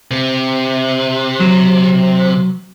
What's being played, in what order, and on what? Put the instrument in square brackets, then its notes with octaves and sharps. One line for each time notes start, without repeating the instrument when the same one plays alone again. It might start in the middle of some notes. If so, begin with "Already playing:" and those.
[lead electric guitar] C3
[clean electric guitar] F#3